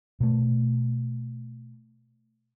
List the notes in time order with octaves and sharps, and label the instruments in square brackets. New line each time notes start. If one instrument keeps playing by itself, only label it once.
[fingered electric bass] B2 A3